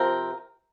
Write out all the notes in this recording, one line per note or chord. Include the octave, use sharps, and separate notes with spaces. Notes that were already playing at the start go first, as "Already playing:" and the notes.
Already playing: C3 F3 C4 A#4